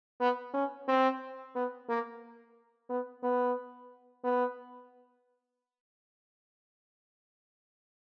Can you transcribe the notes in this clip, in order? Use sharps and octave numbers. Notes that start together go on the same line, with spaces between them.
B3
C#4
C4
B3
A#3
B3
B3
B3